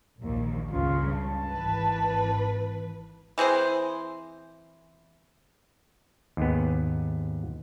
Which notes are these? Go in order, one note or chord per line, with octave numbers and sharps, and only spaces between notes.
A#1 D#2
C#2 G2 C#3 F4
A5
G#1 E3 B4
E3 C4 G#4 C5
D#2 G#2 B3